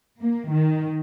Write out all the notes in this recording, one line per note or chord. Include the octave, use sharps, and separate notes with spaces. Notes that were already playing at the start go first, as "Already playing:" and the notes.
A#3
D#3